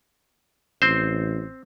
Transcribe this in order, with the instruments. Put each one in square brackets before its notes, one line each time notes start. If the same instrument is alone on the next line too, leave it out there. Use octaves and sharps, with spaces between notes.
[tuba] A1 [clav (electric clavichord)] C4 C5